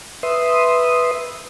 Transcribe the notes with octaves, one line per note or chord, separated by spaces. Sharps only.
B4 E5 C6 D#6